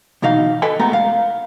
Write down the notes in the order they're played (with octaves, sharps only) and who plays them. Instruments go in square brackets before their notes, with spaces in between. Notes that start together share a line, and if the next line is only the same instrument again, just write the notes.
[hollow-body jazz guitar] D2 B2 E3 D#4 F5
A4 B4 D#5 G5 G#5
G#3 A3 B3 F#4 A#5
F5